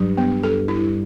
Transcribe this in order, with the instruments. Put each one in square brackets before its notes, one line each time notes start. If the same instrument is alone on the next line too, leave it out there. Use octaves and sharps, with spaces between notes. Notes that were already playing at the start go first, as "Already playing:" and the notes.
Already playing: [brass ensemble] G2 [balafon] F#3
[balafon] B3
A4
E4